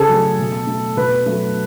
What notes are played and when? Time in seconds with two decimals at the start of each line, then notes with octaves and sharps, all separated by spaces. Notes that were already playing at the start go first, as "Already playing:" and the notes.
Already playing: C#3 G#4 A4
0.09 F#3 A3
0.39 B2
0.67 A3
0.97 B2 B4
1.26 F#3 A3